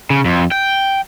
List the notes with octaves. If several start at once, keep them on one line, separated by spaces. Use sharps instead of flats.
C#3
F2
G5